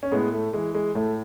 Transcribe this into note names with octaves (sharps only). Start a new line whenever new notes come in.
C#4
A2 G#3 B3
A3
E3 G#3
G#3
A2 A3